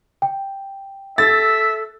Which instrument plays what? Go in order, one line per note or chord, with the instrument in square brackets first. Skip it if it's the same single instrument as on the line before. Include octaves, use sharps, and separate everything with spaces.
[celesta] G5
[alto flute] A4 [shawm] E5 [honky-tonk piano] A6